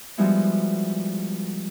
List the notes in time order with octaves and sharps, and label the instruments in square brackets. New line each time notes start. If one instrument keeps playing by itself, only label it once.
[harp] F3 G3 G#3 B3 E4 F#4